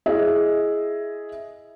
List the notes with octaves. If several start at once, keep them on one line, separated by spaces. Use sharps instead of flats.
E4 G#4 D#5 E5